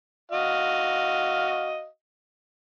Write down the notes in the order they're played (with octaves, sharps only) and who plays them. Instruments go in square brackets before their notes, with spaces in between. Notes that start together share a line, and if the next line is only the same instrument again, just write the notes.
[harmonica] F#4 D#5 F5